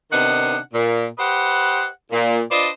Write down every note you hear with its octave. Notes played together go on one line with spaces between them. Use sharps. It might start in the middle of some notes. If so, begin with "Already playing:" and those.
C3 D#3 B3 D4 D#4 F#5
A#2
G4 B4 C5 D#5 F#5
A#2
D4 F4 B4 C5 D5 D#5